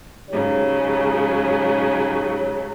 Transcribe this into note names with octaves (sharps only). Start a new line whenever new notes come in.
G#2 C#3 F#3 D#4 G4 C#5